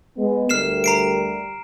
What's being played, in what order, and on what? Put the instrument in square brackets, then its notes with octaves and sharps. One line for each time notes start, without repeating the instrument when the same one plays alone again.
[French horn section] G#3 B3
[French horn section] D2 G3 A#4 [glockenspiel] F6 C7 E7
[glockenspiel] A#5 C7 D7